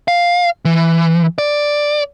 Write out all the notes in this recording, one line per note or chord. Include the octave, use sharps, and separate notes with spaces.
F5
E3
D5